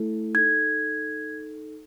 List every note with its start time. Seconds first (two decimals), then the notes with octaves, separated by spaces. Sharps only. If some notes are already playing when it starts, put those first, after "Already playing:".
Already playing: A3 E4 A4
0.34 D#4 A4 G#6